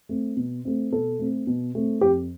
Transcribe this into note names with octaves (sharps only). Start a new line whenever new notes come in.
A3 C4
B2
A3 C4
B2 A4
A3 C4
B2
A3 C4
F2 G4